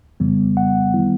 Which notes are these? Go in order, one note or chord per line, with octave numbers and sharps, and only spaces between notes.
F2 C#3 E3 G3 B3
F#5
D#3 G3 B3 E4